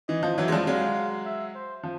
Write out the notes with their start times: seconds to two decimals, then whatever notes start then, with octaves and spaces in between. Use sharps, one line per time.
0.09 E3 D#5
0.23 F3
0.38 E3 F#3 E5
0.48 G#3
0.52 F3 G3
0.67 F#3 G#3 F5
1.25 E5
1.55 C5
1.84 F3